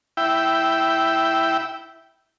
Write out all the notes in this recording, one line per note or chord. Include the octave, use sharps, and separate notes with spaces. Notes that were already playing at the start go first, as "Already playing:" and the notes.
E4 G5